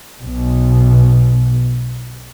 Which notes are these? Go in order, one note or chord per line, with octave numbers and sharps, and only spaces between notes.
B1 B2